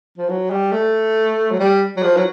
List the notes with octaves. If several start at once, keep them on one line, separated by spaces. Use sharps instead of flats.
F3
F#3
G3
A3
F#3
G3
F#3
F3
F#3